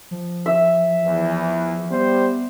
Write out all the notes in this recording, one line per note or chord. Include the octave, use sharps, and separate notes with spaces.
F3
E5
E2 E3
G3 B3 C5